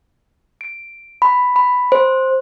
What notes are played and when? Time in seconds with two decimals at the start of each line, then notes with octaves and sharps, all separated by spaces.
0.61 D7
1.22 B5
1.56 B5
1.92 C5